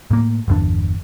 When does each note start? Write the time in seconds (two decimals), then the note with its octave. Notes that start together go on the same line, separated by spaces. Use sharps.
0.11 A2 A#3
0.48 G1 E2 D4